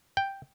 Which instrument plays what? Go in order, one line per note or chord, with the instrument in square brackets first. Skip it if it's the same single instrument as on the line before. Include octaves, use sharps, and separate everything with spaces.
[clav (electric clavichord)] G5